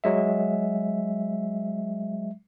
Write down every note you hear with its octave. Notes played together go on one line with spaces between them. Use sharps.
F#3 G#3 E5